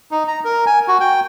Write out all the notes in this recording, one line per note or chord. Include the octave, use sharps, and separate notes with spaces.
D#4
A#5
A#4
G#5
F#4
G5